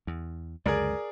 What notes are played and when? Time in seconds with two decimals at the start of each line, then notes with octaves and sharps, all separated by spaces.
0.07 E2
0.66 C#2 F#2 D3 G#4 A#4 D5